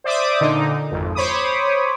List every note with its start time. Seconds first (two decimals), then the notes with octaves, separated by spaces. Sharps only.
0.04 C5 D5 E5 D6 D#6
0.41 A#2 D3 D#4
0.91 G#1 F2
1.15 C5 C#5 B5 D6 D#6